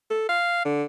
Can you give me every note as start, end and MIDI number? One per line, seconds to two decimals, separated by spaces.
0.10 0.26 69
0.29 0.61 77
0.65 0.83 50